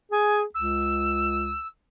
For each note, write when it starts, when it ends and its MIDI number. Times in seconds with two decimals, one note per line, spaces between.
0.12 0.44 68
0.12 0.39 80
0.54 1.57 37
0.54 1.67 88